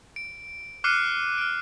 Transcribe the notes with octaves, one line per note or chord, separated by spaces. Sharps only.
D7
D6 F6 F#6 C7 C#7 D#7
F6 D7